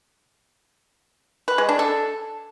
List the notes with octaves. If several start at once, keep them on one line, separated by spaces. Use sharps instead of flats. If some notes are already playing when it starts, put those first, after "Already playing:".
B4
G#3
D4
A4